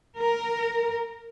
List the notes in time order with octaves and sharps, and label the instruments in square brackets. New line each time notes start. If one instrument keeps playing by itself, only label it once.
[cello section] A#4